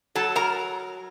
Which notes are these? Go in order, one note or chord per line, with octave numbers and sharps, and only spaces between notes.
F#3 A4 A5
A#4 A#5